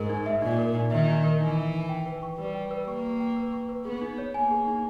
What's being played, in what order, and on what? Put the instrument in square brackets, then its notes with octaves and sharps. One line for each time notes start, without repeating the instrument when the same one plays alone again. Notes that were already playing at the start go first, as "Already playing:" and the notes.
Already playing: [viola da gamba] G#2 [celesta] A#4
[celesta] D#4
E5
[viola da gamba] A#2 [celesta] D#4
[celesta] A#4
D#4
[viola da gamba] D#3 [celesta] E5
[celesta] D#4
A#4
[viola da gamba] E3 [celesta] D#4
[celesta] E5
D#4
G5
B4
C#6
[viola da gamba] G3 [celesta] B4
[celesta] G5
B4
[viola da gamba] A#3 [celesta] C#6
[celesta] B4
G5
B4
C#6
B4
[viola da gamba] B3 [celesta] G#4
[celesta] D#4
C#5
[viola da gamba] A#3 [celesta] G#5
[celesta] G#4
D#4